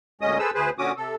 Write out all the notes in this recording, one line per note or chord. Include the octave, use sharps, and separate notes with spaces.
D2 A#2 G#3 C#4 D#5 D#6
G#4 A4 B4 C5 E6
D2 G#4 B4 C5
A#2 D3 C#4 F#4 D6 D#6
C3 A4